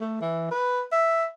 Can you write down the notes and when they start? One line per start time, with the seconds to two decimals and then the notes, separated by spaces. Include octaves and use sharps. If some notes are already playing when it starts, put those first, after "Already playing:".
0.01 A3
0.21 E3
0.51 B4
0.92 E5